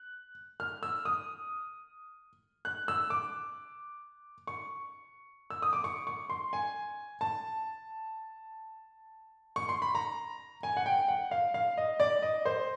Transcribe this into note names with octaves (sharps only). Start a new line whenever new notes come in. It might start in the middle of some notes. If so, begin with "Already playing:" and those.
Already playing: F#6
F6
E6
D#6
F#6
E6
D6
C#6
E6
D#6
D6
C#6
C#6
C6
G#5
A5
C#6
C6
B5
A#5
G#5
F#5
G5
F#5
F5
F5
D#5
D5
D#5
C5